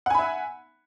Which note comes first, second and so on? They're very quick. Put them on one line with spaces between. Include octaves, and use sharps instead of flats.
F#5 G#5 B5 E5